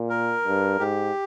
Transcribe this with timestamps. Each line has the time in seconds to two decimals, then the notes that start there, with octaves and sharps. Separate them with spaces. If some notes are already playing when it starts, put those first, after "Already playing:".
Already playing: A#2
0.09 A#4
0.44 G2
0.79 G#2 G4